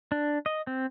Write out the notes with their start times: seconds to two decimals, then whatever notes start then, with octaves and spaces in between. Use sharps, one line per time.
0.12 D4
0.46 D#5
0.67 C4